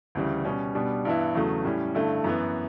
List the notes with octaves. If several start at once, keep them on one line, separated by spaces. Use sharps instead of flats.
D2 C#3 E3 G3
B2 G3 C#4
B2 G3 B3 D4
G2 E3 B3 E4
E2 C#3 F#3 A3
A2 G3 C#4
G2 D3 A3 E4
F#2 E3 B3